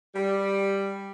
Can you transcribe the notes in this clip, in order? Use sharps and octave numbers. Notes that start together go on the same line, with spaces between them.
G3